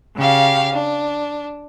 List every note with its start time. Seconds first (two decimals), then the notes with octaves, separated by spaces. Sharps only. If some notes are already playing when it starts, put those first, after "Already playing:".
0.17 C#3 G4 F5
0.74 D4